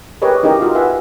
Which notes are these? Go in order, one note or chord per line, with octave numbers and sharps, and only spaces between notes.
G4 G#4 A#4 B4 C#5 D#5
C#4 D#4 E4 G4 A#4 D#5
F4 F#4 F5
B4 E5 F#5 G#5